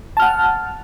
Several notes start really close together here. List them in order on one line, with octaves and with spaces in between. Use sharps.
A5 F6 F#5